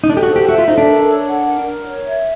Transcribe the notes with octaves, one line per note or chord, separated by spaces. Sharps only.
D#4
D4 A4
G4
F#4
C5
G4
F#4 E5
F4
D#4 A4
D4
A#4
C#5
F#5
A#4
A#4
C#5
E5